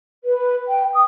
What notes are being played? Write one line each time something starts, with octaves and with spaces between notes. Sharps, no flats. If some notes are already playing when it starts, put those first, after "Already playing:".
B4
G5
D#6